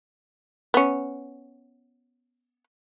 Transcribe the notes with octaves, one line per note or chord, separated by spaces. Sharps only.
B3 C#4